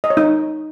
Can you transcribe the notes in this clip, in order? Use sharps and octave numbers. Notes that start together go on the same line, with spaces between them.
D#5
C#5
D#4